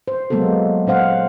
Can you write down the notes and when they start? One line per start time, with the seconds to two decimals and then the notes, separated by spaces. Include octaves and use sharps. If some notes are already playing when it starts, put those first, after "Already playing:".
0.08 C5
0.30 F#3 G#3 A#3 B3 F#4 A4
0.87 A#2 C#4 C5 F5 F#5